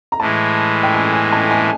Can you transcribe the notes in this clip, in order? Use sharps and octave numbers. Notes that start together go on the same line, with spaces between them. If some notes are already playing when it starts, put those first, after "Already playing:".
A#5
A2 E3 G#3 A5
G5
G#5
G#5
A5
G#5